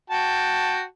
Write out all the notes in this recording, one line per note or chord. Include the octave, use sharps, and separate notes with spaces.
F#4 G5 A5